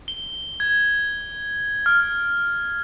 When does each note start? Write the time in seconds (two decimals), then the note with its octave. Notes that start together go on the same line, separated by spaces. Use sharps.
0.08 G7
0.60 G#6
1.86 F6